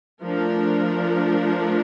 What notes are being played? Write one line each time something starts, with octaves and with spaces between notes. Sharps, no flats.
F3 A3 D4 A#4